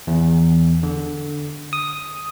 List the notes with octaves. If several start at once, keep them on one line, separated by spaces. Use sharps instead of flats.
E2
D3
D#6